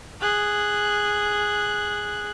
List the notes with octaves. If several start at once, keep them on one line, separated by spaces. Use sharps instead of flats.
G#4 F#6